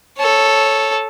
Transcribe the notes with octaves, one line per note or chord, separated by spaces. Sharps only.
A4 C#5